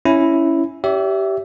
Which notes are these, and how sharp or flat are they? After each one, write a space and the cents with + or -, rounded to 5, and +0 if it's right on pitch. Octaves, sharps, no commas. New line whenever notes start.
C#4 +0 E4 +0
G4 -15 C#5 +45 E5 +0